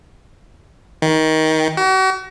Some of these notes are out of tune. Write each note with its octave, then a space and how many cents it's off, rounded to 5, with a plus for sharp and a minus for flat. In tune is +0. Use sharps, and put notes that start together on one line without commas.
D#3 +20
F#4 +40